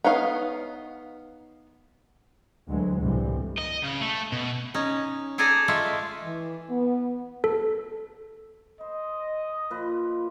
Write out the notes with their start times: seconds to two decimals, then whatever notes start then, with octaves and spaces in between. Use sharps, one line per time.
0.04 B3 D#4 C#5 F5
2.68 D2 D3 E3 F#3 G#3
3.01 G1 C2 A2 C3 E3 G3
3.59 D#5
3.84 C#3
4.01 A3
4.32 B2
4.74 C#4 D#4
5.38 G#4 A4 D5 G#5 A#5
5.68 G#3 A3 F4 E5
6.24 E3
6.69 B3
7.44 A4
8.81 C5 D#5
9.71 A#2 F3 B4